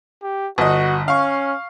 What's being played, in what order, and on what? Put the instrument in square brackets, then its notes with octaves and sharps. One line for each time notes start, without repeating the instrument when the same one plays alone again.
[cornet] G4
[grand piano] G1 D#5 [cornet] F#4
[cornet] C#4 [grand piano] F5 C#6